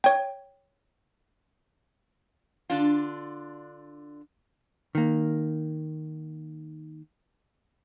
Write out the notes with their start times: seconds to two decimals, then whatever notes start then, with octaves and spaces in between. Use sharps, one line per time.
0.04 C#5 G5
2.70 D3 D4 F4
4.95 D#3 A#3